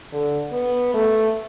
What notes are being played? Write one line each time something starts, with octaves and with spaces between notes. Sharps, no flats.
D3
B3
A3